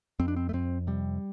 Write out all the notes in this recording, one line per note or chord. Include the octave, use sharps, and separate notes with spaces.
F2 C4
D4
C4
A3
F2 C4
C3 G3